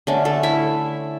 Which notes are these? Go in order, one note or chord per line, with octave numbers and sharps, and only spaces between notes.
D3 A3 C#4
A3 A4
E4 E5